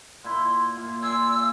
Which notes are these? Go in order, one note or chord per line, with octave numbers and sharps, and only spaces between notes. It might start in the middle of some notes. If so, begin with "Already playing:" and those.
A#2 E4 C6
A#2 F4
D5 G#5 C6 E6
F5